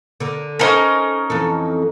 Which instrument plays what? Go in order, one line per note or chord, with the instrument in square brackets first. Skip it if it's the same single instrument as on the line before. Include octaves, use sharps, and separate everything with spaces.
[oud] D3 A#4
[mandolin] C#4 D#4 A#4 [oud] A4 C5
[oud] F2 E3 A4